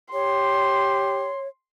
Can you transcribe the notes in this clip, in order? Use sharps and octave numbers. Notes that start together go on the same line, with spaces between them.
G4 C#5 C6